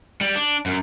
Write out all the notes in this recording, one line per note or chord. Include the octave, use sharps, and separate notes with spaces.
G3
D4
F#2